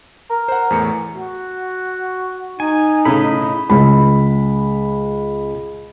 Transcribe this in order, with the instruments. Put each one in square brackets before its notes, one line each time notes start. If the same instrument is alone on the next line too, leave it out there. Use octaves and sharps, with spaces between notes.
[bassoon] A#4
[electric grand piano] C5 F#5
E2 A2 C#7
[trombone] F#4
[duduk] D#4 [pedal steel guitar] G#5
[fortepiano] A2 C#3 [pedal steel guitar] D#5 B5
[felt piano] C#2 B5